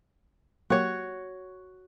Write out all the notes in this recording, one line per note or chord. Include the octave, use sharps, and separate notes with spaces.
F#3 A#3 F#4 G4 C#5